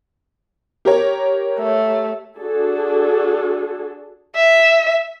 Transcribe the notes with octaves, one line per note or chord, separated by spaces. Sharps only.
G4 A#4 C#5
A3
D4 F#4 G#4 A4
E5